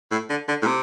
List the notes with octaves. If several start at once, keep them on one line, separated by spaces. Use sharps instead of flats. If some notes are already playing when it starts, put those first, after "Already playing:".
A2
D3
D3
A2
C3